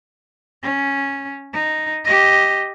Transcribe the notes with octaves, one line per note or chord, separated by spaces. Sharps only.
C#4
D#4
G4 D#5